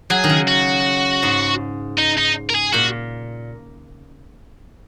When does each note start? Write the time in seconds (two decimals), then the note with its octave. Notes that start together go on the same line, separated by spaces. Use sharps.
0.10 F#3 G#4
0.24 D#3
0.29 C#3
0.48 F#4
1.23 G#2
1.98 D#4
2.18 D#4
2.50 A#4
2.55 G#4
2.73 A#2 F#4